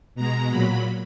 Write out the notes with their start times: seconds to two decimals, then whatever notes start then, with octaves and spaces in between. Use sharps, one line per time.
0.15 B2 G#3 A#5
0.50 A#2 F#3 B5